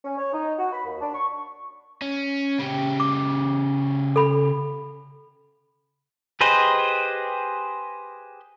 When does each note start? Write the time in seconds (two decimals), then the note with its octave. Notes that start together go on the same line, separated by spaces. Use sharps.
0.05 C#4
0.17 C#5
0.33 D#4
0.59 F#4
0.73 B5
0.85 D#2
1.01 D4
1.14 C#6
2.02 C#4
2.59 C#3 G4
3.00 D6
4.16 A4 B5
6.41 G4 G#4 B4 C5 D#5